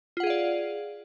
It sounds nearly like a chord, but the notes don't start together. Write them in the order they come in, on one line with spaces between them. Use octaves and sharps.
F4 F#5 G#4 F5 D5